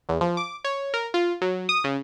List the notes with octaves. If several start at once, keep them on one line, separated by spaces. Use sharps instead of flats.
E2
F3
D6
C#5
A#4
F4
F#3
D#6
C#3